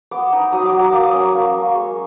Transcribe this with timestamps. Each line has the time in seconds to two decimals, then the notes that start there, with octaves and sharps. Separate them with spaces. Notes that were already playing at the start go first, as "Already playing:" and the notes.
0.11 B3 D6
0.32 D#4
0.52 F#3 D#6
0.66 D6
0.73 F#3
0.80 D6
0.92 A#3 D6
1.03 D#6
1.13 C#4 D6
1.24 C#6
1.34 A#3
1.54 A#3
1.74 G#3 C#6